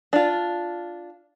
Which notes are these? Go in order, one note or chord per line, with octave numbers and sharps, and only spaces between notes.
D4 F4